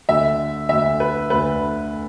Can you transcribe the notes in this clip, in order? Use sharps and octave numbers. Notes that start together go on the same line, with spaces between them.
D2 D3 E5
D2 D3 E5
B4
D2 D3 B4